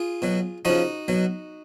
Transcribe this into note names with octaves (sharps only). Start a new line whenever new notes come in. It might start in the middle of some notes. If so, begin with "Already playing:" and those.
Already playing: F4 G#4
B2 F#3
C#3 F3 D#4 F#4
B2 F#3